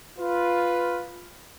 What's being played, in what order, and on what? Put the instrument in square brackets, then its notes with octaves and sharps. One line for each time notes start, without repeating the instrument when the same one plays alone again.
[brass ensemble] F4 B4